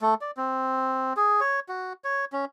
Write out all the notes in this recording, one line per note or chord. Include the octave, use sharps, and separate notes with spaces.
A3
D5
C4
G#4
C#5
F#4
C#5
C#4